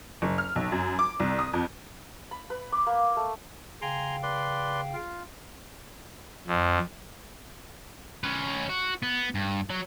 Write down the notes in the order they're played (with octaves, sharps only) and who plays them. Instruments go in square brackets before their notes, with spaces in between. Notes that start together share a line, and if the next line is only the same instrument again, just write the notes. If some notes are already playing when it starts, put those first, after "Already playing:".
[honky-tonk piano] F#1
F6
B1
F#2
D6
C2
D#6
F2
[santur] B5
B4
D6
A#3
A3
[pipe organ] C#3 F5 G5 [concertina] G#5 A#5 C6
[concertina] B4 D5 C6
F4
[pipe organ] F2
[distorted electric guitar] C#4 B4
F#4
B3
G2
F#3